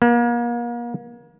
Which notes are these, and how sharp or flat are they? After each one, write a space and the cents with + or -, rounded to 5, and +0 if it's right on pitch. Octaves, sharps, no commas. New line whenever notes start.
A#3 +40